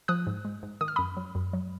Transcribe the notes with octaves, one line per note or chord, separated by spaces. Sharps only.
F3 D#6 F#6
G#2
G#3
G#2
D#3 D#6
F6
F#2 B5 D#6
F#3
F#2
F#3